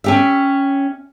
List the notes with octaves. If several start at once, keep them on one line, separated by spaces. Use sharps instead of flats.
C#4 G4 E5